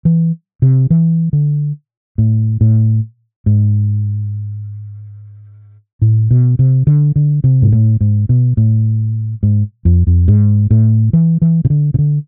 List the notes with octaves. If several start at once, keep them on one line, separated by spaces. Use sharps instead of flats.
E3
C3
E3
D3
A2
A2
G#2
A2
B2
C3
D3
D3
C3
G#2
A2
G#2
B2
A2
G#2
F2
F2
G#2
A2
E3
E3
C3
D3
C3
D3